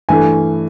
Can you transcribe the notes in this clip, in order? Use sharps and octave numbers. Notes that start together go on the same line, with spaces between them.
G2 E3 A3 G#5